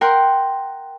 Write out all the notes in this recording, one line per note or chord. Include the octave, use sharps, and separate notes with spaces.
A#4 F#5 G5 C6